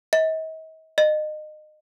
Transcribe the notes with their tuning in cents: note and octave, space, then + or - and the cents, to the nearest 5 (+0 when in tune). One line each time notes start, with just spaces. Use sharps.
D#5 +45
D#5 -25